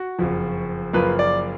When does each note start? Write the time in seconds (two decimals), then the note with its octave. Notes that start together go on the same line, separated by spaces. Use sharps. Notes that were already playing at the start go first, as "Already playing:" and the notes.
Already playing: F#4
0.18 F#1 F2 F3
0.93 F#1 F#2 F3 A#3 B4
1.19 D5